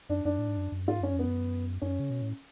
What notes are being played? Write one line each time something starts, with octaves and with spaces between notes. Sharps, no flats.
F#2 D4
F#2 D4
A2
G#2
F#2
F#2
G#2 F4
F#2 C#4
F2
B3
F#2
F#2 C#4
C#3
B2
A2